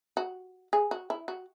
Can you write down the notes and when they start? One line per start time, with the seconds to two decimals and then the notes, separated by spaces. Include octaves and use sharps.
0.17 F#4
0.73 G#4
0.91 F#4
1.10 E4
1.28 F#4